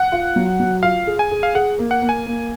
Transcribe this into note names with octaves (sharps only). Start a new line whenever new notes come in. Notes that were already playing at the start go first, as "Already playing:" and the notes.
Already playing: F#5
F4
F#3
F#3
F4 F5
G#4
G#5
G#4
F5
G#4 F#5
A#3
F#5
A#3
G#5
A#3